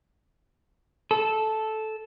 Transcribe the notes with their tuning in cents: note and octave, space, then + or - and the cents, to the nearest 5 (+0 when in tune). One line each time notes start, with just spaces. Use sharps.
A4 -10